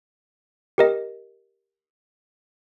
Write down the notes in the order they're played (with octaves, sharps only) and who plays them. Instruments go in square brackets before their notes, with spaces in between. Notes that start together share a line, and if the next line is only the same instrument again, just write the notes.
[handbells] G4 A#4 D#5